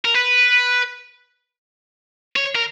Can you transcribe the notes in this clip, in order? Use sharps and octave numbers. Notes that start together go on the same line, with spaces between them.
A#4
B4
C#5
A#4